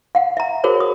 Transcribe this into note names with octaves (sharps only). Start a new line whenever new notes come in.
F5 F#5
E5 A#5
F#4 G#4 A#4 C5 C#5
D#6